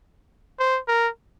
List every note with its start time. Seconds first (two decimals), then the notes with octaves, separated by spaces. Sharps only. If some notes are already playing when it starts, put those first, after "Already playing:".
0.59 C5
0.88 A#4